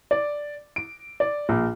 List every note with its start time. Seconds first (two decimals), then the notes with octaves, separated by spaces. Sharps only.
0.11 D5
0.76 D7
1.20 D5
1.49 A#1